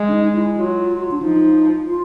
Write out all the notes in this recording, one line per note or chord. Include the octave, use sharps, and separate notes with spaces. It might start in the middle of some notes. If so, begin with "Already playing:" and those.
Already playing: G#3
D4
D#4
E4
F#3 F4
D4
F3 D#4
F4